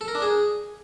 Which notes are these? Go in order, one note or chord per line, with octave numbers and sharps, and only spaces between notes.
A4
A#4
D4
G#4